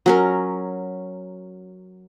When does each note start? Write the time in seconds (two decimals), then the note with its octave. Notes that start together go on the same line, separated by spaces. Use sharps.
0.06 F#3 C#4 A#4